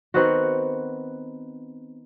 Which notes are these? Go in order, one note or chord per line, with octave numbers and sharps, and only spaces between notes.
D#3 B3 C4 F#4